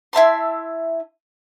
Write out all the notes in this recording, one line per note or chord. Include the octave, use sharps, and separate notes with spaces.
E4 E5 A5 C6